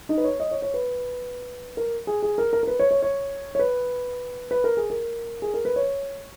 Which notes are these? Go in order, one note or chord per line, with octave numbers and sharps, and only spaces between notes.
D#4
B4
C#5
D#5
C#5
C#5
B4
A#4
G#4
G#4
A#4
A#4
A#4
B4
C#5
C#5
C#5
C#5
B4
B4
A#4
G#4
A#4
G#4
A#4
B4
C#5